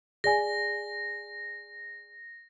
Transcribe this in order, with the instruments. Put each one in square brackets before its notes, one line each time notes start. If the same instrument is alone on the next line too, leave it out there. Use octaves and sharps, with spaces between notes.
[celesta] G#4 D5 G#5 [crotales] A#6